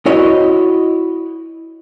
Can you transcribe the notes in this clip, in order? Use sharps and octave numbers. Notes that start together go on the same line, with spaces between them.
E4 F#4 C#5 D#5